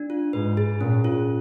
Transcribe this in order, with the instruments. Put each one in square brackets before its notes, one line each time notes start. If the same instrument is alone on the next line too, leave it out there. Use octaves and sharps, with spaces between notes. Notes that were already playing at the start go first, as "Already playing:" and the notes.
Already playing: [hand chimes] D4
F4
[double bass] G#2 [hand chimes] B4
[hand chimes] G#4
[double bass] A#2 [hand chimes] C#4
[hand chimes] F4